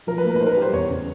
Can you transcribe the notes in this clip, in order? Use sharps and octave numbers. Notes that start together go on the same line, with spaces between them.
F3 A#4
B4
A#3
A#4
B4
D#4 C5
A#4
B4
G3 C5
E2 C#5
C#3